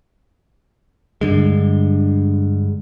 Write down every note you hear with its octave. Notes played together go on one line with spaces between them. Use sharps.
G2 D3 G#3